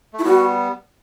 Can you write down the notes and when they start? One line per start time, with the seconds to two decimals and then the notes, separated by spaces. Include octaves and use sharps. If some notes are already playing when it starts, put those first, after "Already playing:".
0.13 A3
0.19 E4
0.24 G3 B3 F#4